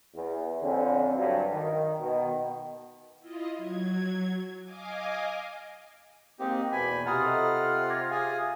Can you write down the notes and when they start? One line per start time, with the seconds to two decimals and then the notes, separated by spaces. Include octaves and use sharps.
0.14 E2
0.63 F2 D3 C4 C#4
1.14 G2 F#3
1.51 D#3
1.99 B2 D#3
3.19 E4 F4 D#5
3.57 F#3 G#6
4.62 D#5 F5 G#5 D6
6.39 G#3 A#3 C4 D#4 G4
6.72 E2 B2 G#5 B5
7.06 C3 F4 F#5 A#5 B5 D#6 F6
7.25 A4 D#5 D#6
7.90 D6 G#6 A#6
8.11 G#4 F5 G#5